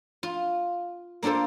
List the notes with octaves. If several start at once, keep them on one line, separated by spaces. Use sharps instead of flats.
F4
A#3 D4 F4 A4 C5